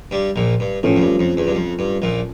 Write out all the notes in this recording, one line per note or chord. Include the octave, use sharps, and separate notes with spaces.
G2 G3
A#1 A#2
G2
A1 A2 F3 A3 C#4
F2
G2
F2
E2
G2
F2
G2
A#1 A#2